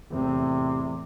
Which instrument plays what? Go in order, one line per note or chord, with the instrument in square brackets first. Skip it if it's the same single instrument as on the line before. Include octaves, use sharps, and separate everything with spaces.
[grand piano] E2 A2 C4 [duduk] C3